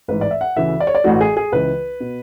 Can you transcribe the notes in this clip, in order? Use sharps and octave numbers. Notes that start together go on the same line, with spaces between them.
A1 G#2 E3 B4
D5
E5
F#5
D2 C#3 E3 E5
D5
C#5
D5
A1 A2 E3 F#4
G#4
G#4
C#2 C#3 E3 B4
B2